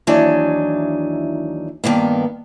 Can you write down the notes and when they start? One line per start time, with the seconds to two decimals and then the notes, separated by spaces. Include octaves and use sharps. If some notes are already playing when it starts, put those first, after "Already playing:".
0.07 D#2 E3 F#3 D4 D#4
1.84 G2 D#3 A#3 B3